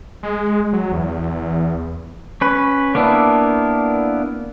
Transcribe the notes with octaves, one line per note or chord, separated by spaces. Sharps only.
G#3
F#3
E2
C#4 B4
A#3 B3 D4 E4